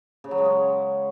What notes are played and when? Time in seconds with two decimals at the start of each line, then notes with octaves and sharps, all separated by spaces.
0.24 C#3
0.31 F#3
0.38 G#3
0.45 C#4